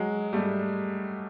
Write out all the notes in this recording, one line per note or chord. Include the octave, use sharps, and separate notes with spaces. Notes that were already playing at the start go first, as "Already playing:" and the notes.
Already playing: F#3 G#3
G3 A3